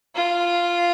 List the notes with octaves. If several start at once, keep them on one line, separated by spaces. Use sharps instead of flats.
F4